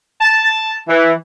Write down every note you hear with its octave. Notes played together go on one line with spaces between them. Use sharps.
A5
E3